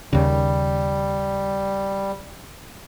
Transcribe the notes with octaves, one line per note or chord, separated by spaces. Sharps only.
D#2 C#3 G3